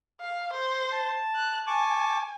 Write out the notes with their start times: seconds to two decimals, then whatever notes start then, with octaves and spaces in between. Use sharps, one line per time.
0.21 F5
0.54 C5
0.92 A5
1.36 F#6
1.67 G#5 A5 C#6 D6